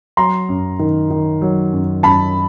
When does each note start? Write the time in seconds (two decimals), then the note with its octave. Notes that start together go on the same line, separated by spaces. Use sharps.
0.17 F#3 A#5 C6
0.49 F#2
0.79 D#3
1.10 D#3
1.41 F#3
1.73 F#2
2.03 F#2 A5 B5